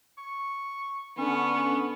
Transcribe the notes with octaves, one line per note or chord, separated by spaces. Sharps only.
C#6
D3 B3 C#4 C#6